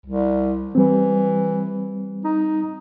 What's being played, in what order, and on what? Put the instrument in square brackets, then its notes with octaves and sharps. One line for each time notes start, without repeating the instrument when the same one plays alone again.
[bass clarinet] C2
[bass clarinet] E3 [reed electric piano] G3 C4
[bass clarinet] D#4